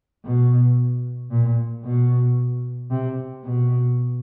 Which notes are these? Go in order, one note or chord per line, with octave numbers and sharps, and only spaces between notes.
B2
A#2
B2
C3
B2